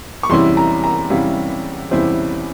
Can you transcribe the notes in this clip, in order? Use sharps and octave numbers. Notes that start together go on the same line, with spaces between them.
C#6
E2 C3 G3 C#4 E4 C6
A#5
A#5
E2 C3 G3 C#4 E4 F5
E2 C3 G3 C#4 E4 C5